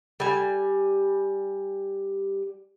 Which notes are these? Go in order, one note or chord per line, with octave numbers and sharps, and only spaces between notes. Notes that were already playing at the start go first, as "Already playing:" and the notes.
G3 G#5